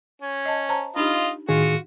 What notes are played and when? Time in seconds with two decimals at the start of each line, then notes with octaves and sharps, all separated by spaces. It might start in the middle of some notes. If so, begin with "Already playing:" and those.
0.22 C#4
0.46 D#5 A5
0.69 C5 A5 A#5
0.96 D4 D#4 F4 G4 D#5 F5
1.49 A2 D#3 F4 F#4 G#4